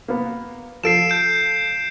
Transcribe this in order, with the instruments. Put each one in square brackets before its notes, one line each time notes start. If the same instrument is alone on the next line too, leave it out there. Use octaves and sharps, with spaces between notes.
[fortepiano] A#3 B3
[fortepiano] F3 A4 [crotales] C7 D7 E7
[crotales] G6 D7